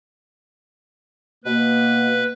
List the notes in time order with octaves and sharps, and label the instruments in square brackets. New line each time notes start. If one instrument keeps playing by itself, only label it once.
[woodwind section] B2 A#3 [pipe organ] B4